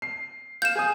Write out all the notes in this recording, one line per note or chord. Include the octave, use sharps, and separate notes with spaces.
C7
F5 G6 E7
G#4 G#5 D#6